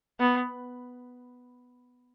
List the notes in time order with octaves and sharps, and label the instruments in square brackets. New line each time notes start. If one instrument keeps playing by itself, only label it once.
[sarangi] B3